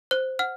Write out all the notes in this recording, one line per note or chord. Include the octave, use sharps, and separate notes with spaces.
C5 F#6
F#5 F6